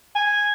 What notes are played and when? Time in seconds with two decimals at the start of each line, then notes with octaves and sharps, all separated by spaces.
0.15 G#5